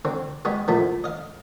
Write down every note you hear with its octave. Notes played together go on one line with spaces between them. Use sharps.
D3 C4
G3 G#3 B3 G#4
E2 A#2 F3 A3 B3
D#5 F5